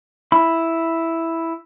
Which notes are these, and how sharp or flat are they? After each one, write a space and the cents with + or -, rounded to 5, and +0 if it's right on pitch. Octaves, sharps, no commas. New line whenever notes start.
E4 +0 B5 +0